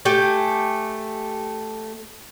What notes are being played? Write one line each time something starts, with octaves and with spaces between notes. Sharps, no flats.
A3 G4 G#5